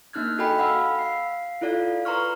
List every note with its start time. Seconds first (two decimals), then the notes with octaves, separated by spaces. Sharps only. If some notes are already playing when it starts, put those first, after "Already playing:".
0.13 A#3 D4 D#4 F6 F#6 G#6
0.38 F#4 A4 D#5 G5 G#5 B5
0.58 F5 F#5 G#5 B5 E6 F6
0.95 F5 C7
1.61 E4 F4 A4 D5 F5
2.05 B4 A#5 C6 C#6 F6